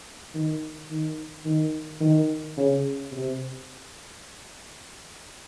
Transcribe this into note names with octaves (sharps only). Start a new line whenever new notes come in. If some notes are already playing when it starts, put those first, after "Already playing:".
D#3
D#3
D#3
D#3
C#3
C3